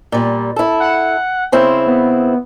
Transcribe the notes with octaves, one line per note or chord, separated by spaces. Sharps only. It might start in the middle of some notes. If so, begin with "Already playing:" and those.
A#2 G3
E4 A4
F#5
C#3 C4 E4 C5
B3